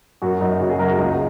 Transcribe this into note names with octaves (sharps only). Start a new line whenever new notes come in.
F#2 F#4
F#2 D#4
C#3 F#4
G#4
F#2 A#4
F#4
C#2 D#4